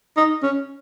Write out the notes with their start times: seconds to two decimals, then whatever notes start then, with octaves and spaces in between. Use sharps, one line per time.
0.17 D#4
0.43 C#4